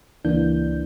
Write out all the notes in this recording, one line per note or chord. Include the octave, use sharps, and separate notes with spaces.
C#2 E3 A#3 D4 G6